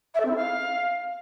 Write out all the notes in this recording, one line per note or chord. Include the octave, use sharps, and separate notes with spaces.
E5
A4
C4
E4
F5